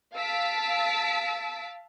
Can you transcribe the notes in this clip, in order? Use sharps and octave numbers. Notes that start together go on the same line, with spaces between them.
F5 A5 E6 A6 B6 D7